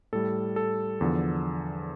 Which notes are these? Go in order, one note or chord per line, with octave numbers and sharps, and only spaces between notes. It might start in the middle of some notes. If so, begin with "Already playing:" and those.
A2 G3 A4
A4
E2 D3 F3